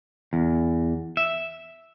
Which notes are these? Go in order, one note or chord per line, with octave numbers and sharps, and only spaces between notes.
E2
E5